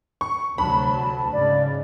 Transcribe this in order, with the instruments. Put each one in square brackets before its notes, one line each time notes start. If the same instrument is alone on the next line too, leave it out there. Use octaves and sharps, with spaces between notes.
[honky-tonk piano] C#6
[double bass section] D2 C3 F#3 [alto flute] A5 [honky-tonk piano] B5
[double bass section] G#2 C#3 [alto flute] D5